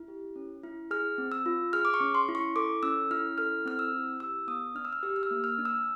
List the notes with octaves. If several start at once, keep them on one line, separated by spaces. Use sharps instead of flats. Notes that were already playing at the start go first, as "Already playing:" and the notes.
Already playing: E4
G4
C#4
E4
G#4 F6
C4
E6
F4
G#4 F6
D6
C#6
C#4
C6
E4
C#6
A4 D6
C#4 E6
E4 F6
A4 F6
C4 F6
E6
E4
G4 E6
B3 D#6
D4 F6
E6
F6
G4 E6
F6
E6
A#3
F6
D4
E6